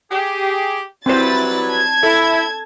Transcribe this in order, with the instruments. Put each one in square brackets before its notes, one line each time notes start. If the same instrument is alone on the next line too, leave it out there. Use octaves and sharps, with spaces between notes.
[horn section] G4 G#4
[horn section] F#3 G3 B4 [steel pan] C4 C5 [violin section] E4 A6
[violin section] A5 G#6
[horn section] E4 [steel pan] A4